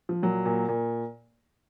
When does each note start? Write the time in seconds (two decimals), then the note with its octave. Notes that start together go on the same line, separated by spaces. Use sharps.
0.09 F3
0.22 A#2 F#3
0.46 A#2
0.68 A#2